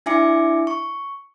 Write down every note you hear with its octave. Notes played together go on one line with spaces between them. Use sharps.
D4 E4 E5 G#5 D6 C#7
C#6